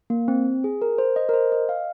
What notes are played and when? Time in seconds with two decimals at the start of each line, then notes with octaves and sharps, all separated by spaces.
0.10 A#3
0.28 C4
0.64 G#4
0.82 A#4
0.98 C5
1.16 D#5
1.29 A#4
1.34 C5
1.52 D#5
1.69 F5